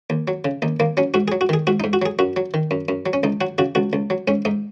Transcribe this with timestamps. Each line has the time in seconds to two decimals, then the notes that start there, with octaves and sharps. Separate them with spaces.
0.10 D#2
0.28 F#3
0.45 C#3
0.62 D#2 D#4
0.80 D#2 A#3
0.97 F#3 C#4
1.14 G#2 F#4
1.28 G#4
1.32 F#3
1.41 F#4
1.49 D#3 G#4
1.67 G#2 F#4
1.80 D#4
1.84 G#2
1.93 F#4
2.02 F#3 G#4
2.19 F#2 F#4
2.36 F#3
2.54 D#3
2.71 F#2
2.89 F#2
3.06 F#3
3.13 C#4
3.23 C#2 D#4
3.41 F#3 F#4
3.58 C#3 F#4
3.75 C#2 F#4
3.93 C#2
4.10 F#3
4.28 G#2 C#4
4.45 G#2 D#4